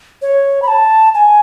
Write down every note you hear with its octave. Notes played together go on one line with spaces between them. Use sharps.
C#5
B5
A5
G#5